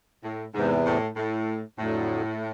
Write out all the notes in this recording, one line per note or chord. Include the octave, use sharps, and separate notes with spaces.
A2
E2 G#2 C3 E3
A2
A2
F2 A2 D3 F#3 A3